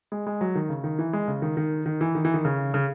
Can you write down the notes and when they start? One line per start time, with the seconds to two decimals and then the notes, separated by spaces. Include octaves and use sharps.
0.12 G#3
0.27 G#3
0.41 F#3
0.55 D#3
0.69 C#3
0.84 D#3
0.99 E3
1.13 G#3
1.28 C#3
1.42 D#3
1.57 D#3
1.86 D#3
2.01 E3
2.15 D#3
2.25 E3
2.34 D#3
2.45 C#3
2.74 C#3